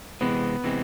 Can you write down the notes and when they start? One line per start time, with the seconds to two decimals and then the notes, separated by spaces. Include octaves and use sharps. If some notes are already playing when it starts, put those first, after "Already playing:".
0.21 C3 E3 G#3 B3 C4
0.64 C3 E3 G#3 C4